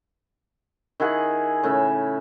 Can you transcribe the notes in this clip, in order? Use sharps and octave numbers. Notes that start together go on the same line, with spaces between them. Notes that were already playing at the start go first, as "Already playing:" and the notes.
D#3 E4 G#4 F#5
A2 C#3 E5